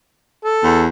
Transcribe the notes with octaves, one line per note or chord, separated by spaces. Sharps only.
A4
E2